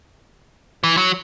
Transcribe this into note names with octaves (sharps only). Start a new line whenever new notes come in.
E3
F#3